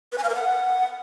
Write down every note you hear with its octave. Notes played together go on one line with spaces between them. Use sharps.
B4
G#5
F5
A#4
F#5